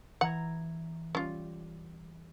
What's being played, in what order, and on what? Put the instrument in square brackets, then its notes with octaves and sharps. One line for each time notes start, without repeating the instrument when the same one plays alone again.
[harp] E3 A#5 G#6 [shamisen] F#5
[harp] G3 [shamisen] C#4 F4